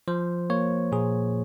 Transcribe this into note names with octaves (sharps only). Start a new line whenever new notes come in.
F3 C5
A#3 C#5
A#2 G#4